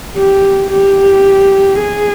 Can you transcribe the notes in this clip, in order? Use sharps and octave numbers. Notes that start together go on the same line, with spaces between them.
G4
G4
G#4